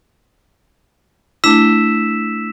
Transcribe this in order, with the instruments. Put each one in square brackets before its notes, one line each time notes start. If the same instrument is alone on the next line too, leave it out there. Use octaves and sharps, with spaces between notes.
[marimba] A3 D4 E4 [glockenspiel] E6 B6 E7